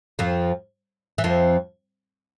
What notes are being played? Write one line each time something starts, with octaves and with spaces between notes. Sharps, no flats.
F2 F3
E3
F2 F3